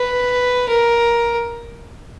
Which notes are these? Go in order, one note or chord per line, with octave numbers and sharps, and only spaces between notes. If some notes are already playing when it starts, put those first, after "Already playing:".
Already playing: B4
A#4